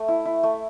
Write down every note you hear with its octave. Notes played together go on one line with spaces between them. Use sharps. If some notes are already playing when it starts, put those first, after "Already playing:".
Already playing: A3
E4
E4
A3